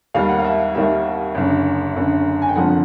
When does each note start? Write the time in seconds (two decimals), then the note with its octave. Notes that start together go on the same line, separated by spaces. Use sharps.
0.14 D#2 D#3 G3 A#3 F5
0.29 F#5
0.39 F5
0.44 E5
0.75 D#2 D#3 G3 A#3 E5
1.35 F#1 F#2 D3
1.95 F#1 F#2 D3
2.42 G#5
2.49 G5
2.55 F#1 F2 D3 F3 F#5